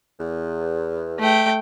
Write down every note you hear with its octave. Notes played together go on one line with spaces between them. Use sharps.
E2
A3 G5